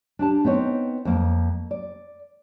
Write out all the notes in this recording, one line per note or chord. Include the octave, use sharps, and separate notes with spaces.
D4 G4 A5
B3 C4 D#4 C#5
F2 A#3
D5